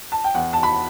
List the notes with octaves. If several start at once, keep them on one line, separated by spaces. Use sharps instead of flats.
A5
G5
E2 F#5
A5
B5